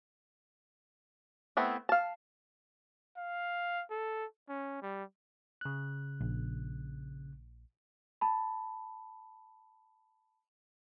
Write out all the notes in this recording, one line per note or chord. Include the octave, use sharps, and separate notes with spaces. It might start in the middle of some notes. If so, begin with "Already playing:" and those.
A3 B3 C4 E4
F5 A5
F5
A4
C#4
G3
C#3 F#6
A#1
A5 B5